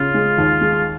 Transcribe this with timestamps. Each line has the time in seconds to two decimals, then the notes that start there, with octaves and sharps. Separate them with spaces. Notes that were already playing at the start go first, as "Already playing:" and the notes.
Already playing: C#3 F4
0.14 G#3
0.38 D#2
0.61 G#3